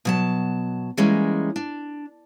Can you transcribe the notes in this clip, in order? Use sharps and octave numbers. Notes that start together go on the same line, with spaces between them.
B2 F#3 A5
E3 G3 G#3 A#3 C#4
D4